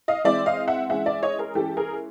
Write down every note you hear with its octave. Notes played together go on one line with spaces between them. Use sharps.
D#5 F5
E3 G#3 C4 D5 E5
D#5 F5
E5 F#5
E3 G#3 C#4 E5 F#5
D5 E5
C#5 D#5
G#4 A#4
E3 G#3 C#4 G4 A4
G#4 A#4